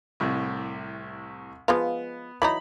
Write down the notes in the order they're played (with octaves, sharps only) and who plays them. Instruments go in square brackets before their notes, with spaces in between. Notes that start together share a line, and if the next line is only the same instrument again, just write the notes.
[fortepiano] C2 A2 C3
[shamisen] F3 G#3 F4 [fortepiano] B3
[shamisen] E3 F#3 D#4 [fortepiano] B5